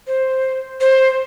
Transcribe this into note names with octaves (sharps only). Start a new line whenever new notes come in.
C5
C5